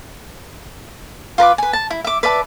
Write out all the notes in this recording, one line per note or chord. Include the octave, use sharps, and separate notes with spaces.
F4 B4 A#5 D6
B4 G#5
A5
E4
E5 D6
B4 D5 E5 A5